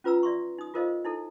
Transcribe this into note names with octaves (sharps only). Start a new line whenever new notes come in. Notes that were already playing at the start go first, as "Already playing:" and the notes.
C#4 F4 B4 A#5 E6
D5 E5 C6 C#6
D#4 D#6
F4 A4 A#4 C5 D#5 F5
D#4 E4 A4